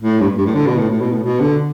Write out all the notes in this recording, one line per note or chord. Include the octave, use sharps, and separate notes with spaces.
A2
G2
G2
A2
D3
B2
A2
A2
B2
A2
B2
D3